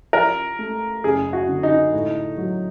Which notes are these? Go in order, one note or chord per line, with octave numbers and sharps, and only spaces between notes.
F3 A#4
A3
F#1 G#4
F#4
D3
D#4
A2
F#3